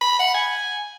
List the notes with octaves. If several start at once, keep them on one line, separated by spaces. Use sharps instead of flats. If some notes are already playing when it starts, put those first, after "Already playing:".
B5
F#5
G#5